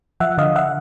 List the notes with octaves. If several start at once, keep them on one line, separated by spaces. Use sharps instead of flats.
F3 E5 F#5
D3 D#5 F5
E5 F#5